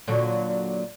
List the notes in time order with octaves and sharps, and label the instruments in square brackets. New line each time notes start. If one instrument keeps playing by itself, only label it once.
[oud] A#2 D3 F#3